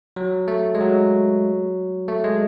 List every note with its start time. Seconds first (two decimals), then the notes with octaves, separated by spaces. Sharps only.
0.16 F#3
0.48 A3
0.75 G#3
0.81 F#3
2.08 A3
2.24 G#3